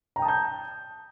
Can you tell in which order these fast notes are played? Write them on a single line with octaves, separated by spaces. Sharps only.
A#5 G5 D#6 A5 G6